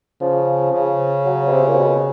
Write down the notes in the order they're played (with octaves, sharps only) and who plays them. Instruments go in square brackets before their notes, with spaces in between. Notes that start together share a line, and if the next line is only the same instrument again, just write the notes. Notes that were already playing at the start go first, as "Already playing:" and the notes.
[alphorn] C#3 [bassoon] F3
[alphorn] C#3
[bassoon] F#3
B2
C3
A#2
B2